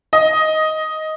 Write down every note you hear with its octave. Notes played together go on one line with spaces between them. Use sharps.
D#5